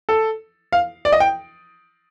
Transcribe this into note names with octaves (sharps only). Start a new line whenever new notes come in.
A4
F5
D5
D#5
G5